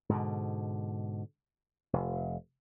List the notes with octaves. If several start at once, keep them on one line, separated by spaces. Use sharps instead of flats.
G#2 B2 D3
F1